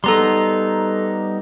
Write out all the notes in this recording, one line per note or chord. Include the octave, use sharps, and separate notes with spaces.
G3 B3 D#4 A4 A#5 C6